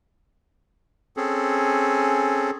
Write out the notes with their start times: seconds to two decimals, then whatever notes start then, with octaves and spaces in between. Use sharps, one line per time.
1.17 C4 C#4 G#4 A4